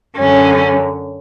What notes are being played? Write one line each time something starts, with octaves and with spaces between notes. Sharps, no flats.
F#2 D3 C#4